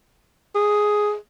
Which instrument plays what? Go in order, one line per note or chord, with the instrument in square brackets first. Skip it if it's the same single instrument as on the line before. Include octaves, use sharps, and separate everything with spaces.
[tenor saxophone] G#4